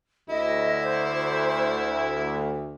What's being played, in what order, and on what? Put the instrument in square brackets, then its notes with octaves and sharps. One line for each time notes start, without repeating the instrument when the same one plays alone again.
[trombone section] D2 [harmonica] E4 [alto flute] D#5
[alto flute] C5